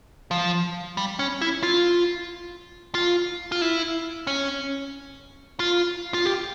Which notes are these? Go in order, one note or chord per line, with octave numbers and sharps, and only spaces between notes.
F3
G3
C#4
E4
F4
F4
F4
E4
C#4
F4
F4
G4